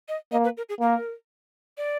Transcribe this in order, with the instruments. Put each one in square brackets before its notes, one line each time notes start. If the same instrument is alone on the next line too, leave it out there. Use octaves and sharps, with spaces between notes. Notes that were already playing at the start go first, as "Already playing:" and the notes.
[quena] D#5
[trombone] A#3 [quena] D#5
[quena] B4
A#4
G#4
[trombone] A#3 [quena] A#4
[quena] D5